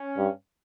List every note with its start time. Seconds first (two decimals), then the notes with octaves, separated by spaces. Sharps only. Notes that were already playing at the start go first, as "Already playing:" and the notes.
Already playing: C#4
0.17 G2